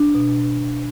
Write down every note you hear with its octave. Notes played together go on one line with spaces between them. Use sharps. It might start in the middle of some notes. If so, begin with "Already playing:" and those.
Already playing: D4
B2